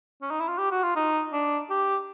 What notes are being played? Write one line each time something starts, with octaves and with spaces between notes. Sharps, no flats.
C#4
D#4
E4
F4
G4
F#4
F4
D#4
D4
G4